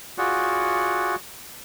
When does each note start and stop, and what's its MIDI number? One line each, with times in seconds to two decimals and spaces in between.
0.18 1.15 65
0.18 1.15 66
0.18 1.15 68
0.18 1.15 74
0.18 1.15 78